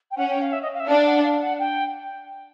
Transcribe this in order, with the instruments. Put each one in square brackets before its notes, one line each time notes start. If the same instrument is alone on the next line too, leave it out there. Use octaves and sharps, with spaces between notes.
[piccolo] G5
[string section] C#4 [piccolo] F#5
[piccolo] G5
F5
E5
D#5
F5
E5
[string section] D4 [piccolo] F5
[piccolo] F#5
F5
F#5
G5